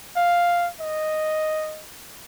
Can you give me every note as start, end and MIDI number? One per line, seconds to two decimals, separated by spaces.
0.16 0.68 77
0.80 1.83 75